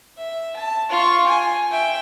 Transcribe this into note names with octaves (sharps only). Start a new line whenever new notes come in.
E5
A5
F4 C#6
G#5
E5 G5